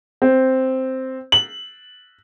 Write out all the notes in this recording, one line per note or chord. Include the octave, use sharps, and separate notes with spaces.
C4
F#7